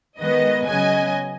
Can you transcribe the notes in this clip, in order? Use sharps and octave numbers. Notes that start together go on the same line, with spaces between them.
D#3 G#3 B3 B4 D#5
C#3 F#3 B3 D#5 G#5